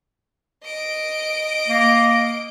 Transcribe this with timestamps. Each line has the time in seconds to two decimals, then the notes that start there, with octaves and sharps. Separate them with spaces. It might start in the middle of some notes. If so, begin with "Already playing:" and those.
0.65 D#5 D7
1.68 A#3